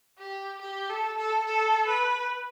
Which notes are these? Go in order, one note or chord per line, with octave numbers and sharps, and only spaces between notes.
G4
G4
A4
A4
A4
B4